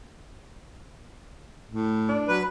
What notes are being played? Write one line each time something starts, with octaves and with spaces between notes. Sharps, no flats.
A2
D4
F#3 B4